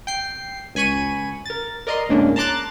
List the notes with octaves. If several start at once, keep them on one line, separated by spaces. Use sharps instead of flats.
G5 C7
C#2 G#5 B5 C#6 D#7
A#4 A6
A#4 D5 D#5 A#5 C6
D2 A2 G#3 A#3 C#4 D4
A5 A#5 C6 D6 F#6 A6